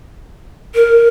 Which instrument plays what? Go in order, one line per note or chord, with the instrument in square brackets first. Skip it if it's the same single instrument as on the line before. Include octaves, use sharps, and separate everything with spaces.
[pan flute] A#4